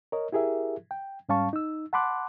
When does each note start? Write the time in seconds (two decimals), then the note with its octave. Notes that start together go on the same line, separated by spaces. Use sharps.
0.12 A#4 C#5 D#5
0.32 E4 G4 G#4 A#4 E5
0.91 G5
1.29 G#2 G3 C#4 F5 A5 C#6
1.53 D#4 E6
1.93 F#5 A5 B5 C6 D6 F#6